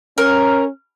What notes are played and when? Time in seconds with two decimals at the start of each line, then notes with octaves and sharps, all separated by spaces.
0.18 C#4 A#4